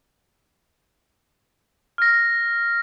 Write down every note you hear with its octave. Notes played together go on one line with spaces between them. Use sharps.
F6 A#6